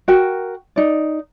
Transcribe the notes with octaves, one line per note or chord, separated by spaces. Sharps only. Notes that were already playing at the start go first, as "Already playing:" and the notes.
F#4 A#4 G5
D#4 D5